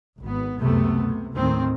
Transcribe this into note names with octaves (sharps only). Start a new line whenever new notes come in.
G#1 B3
C#2 F#2 C3 A3 B3
C3
D#2 A2 D#3 C4